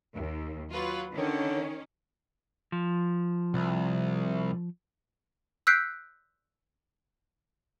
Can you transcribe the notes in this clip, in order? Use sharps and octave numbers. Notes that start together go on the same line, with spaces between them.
D#2
F#3 F4 B4
D3 D#3 C#4
F3
C2
E6 F#6 G6 B6 C7 D7